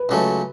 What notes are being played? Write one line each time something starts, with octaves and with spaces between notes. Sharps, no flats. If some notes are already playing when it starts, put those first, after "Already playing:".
Already playing: B4
C#2 C#3 F#3 A3